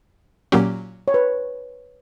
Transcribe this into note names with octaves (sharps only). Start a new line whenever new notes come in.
A#2 F#3 A#3 C#4 G4
C#5
B4